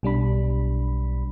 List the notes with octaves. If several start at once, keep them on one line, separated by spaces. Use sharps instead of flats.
B1 G3 D4 B5